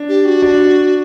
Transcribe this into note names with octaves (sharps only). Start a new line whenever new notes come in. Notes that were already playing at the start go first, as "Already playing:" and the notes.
Already playing: D4
G4
F#4
D4